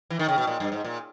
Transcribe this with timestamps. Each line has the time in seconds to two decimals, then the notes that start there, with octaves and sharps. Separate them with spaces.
0.10 E3
0.19 D#3
0.29 C#3
0.38 B2
0.47 A#2
0.60 G2
0.72 G#2
0.85 A#2